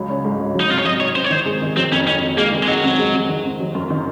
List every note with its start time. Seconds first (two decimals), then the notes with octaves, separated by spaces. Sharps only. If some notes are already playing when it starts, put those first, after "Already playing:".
Already playing: C#2 F#3
0.09 C#4
0.25 G#2
0.40 G#2
0.54 F#3
0.60 D#4
0.70 C3 F4
0.79 C#5
0.85 F#3 D#5
1.00 D#4 C#5
1.16 C4 C5
1.24 C#5
1.30 D#3 C5
1.46 G#3
1.62 D#3
1.76 F#3 C4
1.92 F2 C#4
2.07 D#3 C#4
2.22 F2
2.37 G#3 A#3
2.52 D#3
2.63 G#3
2.68 F#3 D#4
2.84 C4
2.99 G#3
3.13 C4
3.29 D#3
3.45 C4
3.60 F#3
3.75 F#2
3.90 D#3